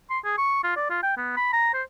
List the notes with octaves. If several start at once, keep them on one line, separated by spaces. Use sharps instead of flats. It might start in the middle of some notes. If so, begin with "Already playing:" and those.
C6
G#4
C#6
F4
D5
F4
G5
B3
B5
A#5
C5